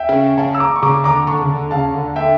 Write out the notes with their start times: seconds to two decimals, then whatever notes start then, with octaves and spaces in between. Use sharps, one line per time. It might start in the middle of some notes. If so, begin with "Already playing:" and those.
Already playing: E5 G5
0.09 C#3
0.37 C#3 F5 A5
0.55 E6
0.60 A#5 D6
0.76 C#6
0.82 C#3 A#5 D6
1.04 D3 A#5 D6
1.27 D3 A5 C#6
1.42 C#3
1.50 D3
1.71 C#3 F5 A5
1.94 D3
2.16 E5 G5